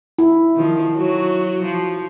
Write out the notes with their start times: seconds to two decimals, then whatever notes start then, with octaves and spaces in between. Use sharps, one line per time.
0.18 E4
0.56 D#3 F3
0.96 F#3 F#4
1.64 F3